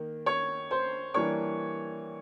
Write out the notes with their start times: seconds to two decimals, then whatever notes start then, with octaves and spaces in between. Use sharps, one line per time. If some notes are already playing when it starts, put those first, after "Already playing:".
Already playing: D#3 A#3
0.26 C#5 C#6
0.71 C5 C6
1.14 E3 G3 A#3 D4 C#5 C#6